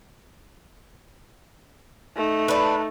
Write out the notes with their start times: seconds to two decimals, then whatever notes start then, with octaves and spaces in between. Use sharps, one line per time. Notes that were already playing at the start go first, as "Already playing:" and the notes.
2.16 A3 D#4
2.48 D4 B4